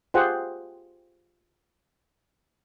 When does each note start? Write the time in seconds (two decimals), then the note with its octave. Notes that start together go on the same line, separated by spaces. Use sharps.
0.14 F4 G4 G#4 C5 F#5